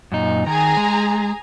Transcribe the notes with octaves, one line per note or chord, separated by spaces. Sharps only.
F#2 A#2 D#4
D#3 G#4 G#5 A#5
G#3